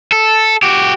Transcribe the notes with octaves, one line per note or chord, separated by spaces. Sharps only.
A4
F#4 G4